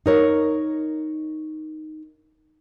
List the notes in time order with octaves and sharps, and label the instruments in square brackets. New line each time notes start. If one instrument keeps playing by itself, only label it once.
[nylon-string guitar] D#4 A#4 C#5